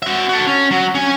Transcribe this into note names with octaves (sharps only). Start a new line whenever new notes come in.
F#4 E5
F#4 A4
C#4
F#3
C#4 G#5